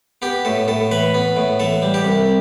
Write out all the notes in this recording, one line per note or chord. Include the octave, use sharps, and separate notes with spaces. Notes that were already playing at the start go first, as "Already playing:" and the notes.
B3 G4
A2 A4
A2 A4
E3 B4
B3
A2
E3 A4
G3
G4
C2